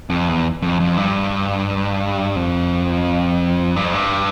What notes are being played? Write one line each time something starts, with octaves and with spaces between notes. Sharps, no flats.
F2
E2
F2
F2
G2
F2
G2
F2
G2